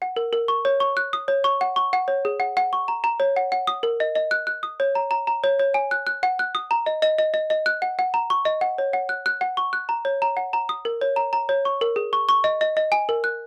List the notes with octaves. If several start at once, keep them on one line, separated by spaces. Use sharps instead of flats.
F#5
A#4
A#4
C#6
C#5
C#6
F#6
D#6
C#5
C#6
F#5
C#6
F#5
C#5
G#4
F#5
F#5
C#6
A#5
A#5
C#5
F#5
F#5
D#6
A#4
D#5
D#5
F#6
F#6
D#6
C#5
A#5
A#5
A#5
C#5
C#5
G#5
F#6
F#6
F#5
F#6
D#6
A#5
D#5
D#5
D#5
D#5
D#5
F#6
F#5
F#5
A#5
C#6
D#5
F#5
C#5
F#5
F#6
F#6
F#5
C#6
F#6
A#5
C#5
A#5
F#5
A#5
D#6
A#4
C#5
A#5
A#5
C#5
C#6
A#4
G#4
C#6
C#6
D#5
D#5
D#5
G#5
A#4
F#6